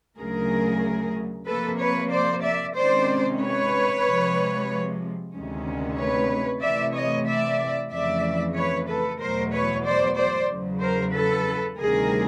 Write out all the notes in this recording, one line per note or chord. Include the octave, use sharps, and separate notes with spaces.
D2 C#3 F#3 A3 G#4 A#4
C3 F3 A#3 A4 B4
B4 C#5
C5 D5
D5 E5
C3 D#3 G#3 C#4 C5 D5
B4 C#5
C3 F3 G#3
D2 C3 D#3 G#3 C#4
B4 C#5
C3 E3 A3 D5 E5
C#5 D#5
D5 E5
F2 C#3 E3 A3 D5 E5
B4 C#5
A4 B4
E2 B2 F#3 A3 A#4 C5
B4 C#5
C5 D5
C5 D5
E2 C#3 F#3
A#4 C5
A4 B4
D2 C3 D#3 G3 C4 G#4 A#4